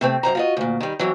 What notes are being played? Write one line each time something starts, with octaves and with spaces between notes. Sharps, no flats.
C3 A3 C4
F#2 C#3 C5 A#5
F4 F#4 D#5
D2 A#2
D#3 G3
F2 A2 E3 F#3